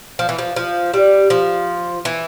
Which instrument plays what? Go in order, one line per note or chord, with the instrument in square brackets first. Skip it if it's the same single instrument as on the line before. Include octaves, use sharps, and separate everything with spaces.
[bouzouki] F3
E3
F3
F3
G3
F3
E3